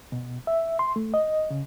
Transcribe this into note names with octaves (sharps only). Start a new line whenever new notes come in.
B2
E5
C6
A3
D#5
C#3